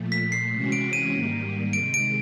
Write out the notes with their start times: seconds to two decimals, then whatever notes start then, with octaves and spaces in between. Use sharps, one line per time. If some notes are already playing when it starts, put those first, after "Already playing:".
Already playing: A#2 F3 A3
0.12 B6
0.32 C7
0.53 C3 E3 G#3 C#4 F#4
0.72 D7
0.93 D#7
1.13 G#2 D#3 G3 A#3
1.73 C3 D#3 G#3 D7
1.94 D7